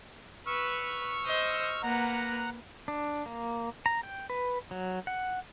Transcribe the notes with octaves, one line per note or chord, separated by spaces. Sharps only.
B4 C#6 E6 F6
C5 D#5
A#3 B4 F#5 A#5
D4
A#3
A#5
G5
B4
F#3
F#5